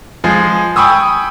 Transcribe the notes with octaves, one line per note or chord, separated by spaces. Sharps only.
F3 G#3 G#4
G5 G#5 B5 C#6 D#6 E6